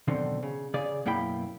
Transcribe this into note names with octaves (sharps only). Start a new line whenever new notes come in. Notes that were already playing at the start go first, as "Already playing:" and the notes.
B2 D3 D#3 F#3 C4
C#3
C#3 G#4 D5
F#2 B2 A#3 E4 G5 B5